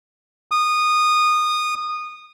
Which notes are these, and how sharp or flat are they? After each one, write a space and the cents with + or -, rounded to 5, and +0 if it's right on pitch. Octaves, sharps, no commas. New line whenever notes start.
D#6 -20